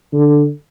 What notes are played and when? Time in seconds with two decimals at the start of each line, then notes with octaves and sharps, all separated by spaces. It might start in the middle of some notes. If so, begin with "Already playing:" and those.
0.13 D3